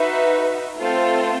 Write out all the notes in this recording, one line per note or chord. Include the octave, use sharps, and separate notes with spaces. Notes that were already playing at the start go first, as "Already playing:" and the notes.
Already playing: D#4 F#4 B4 E5
A3 C4 F4 A4 C5